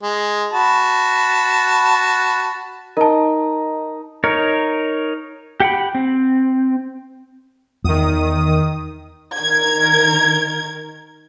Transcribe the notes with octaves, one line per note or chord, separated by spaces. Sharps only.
G#3
F#4 A5 B5
D#4 A#4 A5
D#4 A#4 C#5
G4 F#5 G5 B5
C4
E2 D#3 D#6
D#3 A#4 G#6